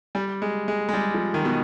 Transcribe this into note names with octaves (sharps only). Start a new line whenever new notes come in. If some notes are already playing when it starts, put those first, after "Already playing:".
G3
G#3
G#3
G#3
G3
F3
D#3
B2